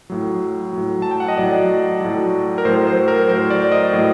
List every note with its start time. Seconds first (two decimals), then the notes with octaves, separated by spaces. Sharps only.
0.10 A2 F#3
0.73 A2 F#3
1.02 A5
1.11 G5
1.20 F#5
1.28 D#5
1.37 A2 F#3 D5
2.01 A2 F#3
2.58 A#4
2.65 A2 F#3 C5
2.87 C5
3.08 A#4
3.29 A2 F#3 C5
3.51 D5
3.72 D#5
3.93 A2 F#3